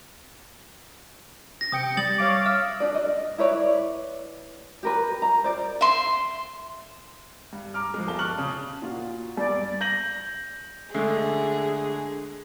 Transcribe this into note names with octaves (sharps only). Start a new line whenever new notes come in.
A#6
C3 G5 D#6 C#7
G3 D#6 A6 F#7
C#5 F5 D6
E5 F6
D4 D5
D#5
E4 B4 C#5 D5
G4 A#4 B4
A#5
C5 D5
E5 C6
G2
A#5 D6 F6
F3 G#3
G1 G3 A5 G7
A5 C#6 F6 F#6 F#7
C#3
A#2 F4 F#4
G2 D5
G6 A#6 F#7
D3 G#3 A3 G#4